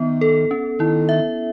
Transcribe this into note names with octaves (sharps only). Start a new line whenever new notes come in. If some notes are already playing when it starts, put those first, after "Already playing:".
Already playing: D#3 B3
A4
C#4
D#3 E4
E5